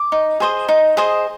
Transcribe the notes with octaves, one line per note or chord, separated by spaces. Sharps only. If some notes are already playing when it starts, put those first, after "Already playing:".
Already playing: D6
D#4
G#4 C5 D#5
D#4
G#4 C5 D#5